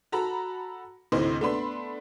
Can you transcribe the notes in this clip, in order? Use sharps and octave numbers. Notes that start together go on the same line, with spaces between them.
F#4 A4 A#5 B5
D2 A2 C3 C5 D#5 C6
A3 B3 D4 B5 C6